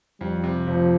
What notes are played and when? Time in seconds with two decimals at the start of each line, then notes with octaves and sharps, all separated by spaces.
0.21 F2 G3
0.44 C3
0.67 F1 F3